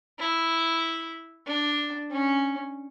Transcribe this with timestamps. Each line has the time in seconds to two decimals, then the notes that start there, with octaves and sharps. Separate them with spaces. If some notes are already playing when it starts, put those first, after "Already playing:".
0.19 E4
1.47 D4
2.11 C#4